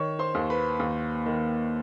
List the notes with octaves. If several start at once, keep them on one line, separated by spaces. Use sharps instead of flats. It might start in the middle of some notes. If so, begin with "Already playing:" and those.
Already playing: D#3 C#5 C#6
C5 C6
D#2
B4 B5
D#2
D#3